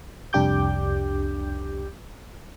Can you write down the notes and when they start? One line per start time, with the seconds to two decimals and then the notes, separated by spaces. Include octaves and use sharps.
0.33 C2 F2 D4 G4 D6 G6